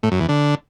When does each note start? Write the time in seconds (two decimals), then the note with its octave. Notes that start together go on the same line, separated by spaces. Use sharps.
0.03 A2
0.12 F#2
0.20 E2
0.29 D3